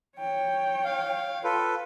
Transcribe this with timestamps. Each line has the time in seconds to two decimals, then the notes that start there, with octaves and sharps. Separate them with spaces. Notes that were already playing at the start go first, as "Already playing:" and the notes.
0.18 C#5 G5
0.84 F5
1.44 F4 A4 B4